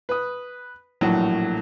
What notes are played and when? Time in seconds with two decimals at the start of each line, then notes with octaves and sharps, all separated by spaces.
0.09 B4 D#6
1.01 A#1 A2 E3 F#3